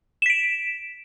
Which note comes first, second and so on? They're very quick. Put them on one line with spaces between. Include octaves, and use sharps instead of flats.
E7 B6 D7